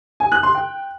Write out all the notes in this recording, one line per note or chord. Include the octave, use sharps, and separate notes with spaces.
G#5
F#6
C6
G5